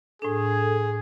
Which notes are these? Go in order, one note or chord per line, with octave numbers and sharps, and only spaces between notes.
A2 D4 G#4 A4